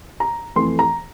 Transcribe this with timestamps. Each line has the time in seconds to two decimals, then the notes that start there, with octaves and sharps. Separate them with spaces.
0.20 A#5
0.56 F2 E3 A3 C6
0.79 A#5